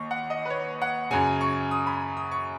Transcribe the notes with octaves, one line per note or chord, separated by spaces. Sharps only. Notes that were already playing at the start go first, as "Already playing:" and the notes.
Already playing: D#2 C#6
F#5
D#5
B4
C#5
F#5
F#2 C#3 G#5
C#6
D#6
B5
D#6
C#6